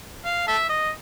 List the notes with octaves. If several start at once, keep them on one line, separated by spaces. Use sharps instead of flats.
F5
A4 E5
D#5